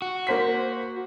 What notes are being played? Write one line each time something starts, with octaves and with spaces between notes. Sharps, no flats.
F#4
A#3 C5 B6